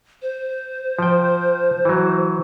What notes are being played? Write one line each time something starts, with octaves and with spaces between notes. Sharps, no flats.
C5
F3 G5
E3 F#3